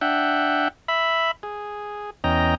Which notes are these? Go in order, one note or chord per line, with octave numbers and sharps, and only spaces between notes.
D4 E5 F#5 G5
E5 B5
G#4
E2 C#4 D#5 G5 A#5